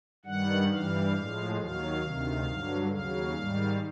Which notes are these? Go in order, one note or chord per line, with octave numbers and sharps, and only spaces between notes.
G2 D#3 G3 F#5
G2 E3 G3 F5
A2 F3 G#3
D#2 D#3 F#3 F5
D2 C3 D#3
G2 D3 F#3
D#2 C#3 F#3 F5
G#2 D#3 G3